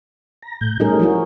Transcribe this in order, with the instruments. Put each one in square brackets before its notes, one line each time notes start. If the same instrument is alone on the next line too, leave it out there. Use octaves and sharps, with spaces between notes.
[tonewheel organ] A#5
A2 G6
[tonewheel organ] G3 A3 D#4 [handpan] C#4 G#4 A#4
[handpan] F3 E4 F#4